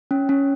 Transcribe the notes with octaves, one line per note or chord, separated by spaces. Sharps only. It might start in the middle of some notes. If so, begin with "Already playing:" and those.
C#4
C#4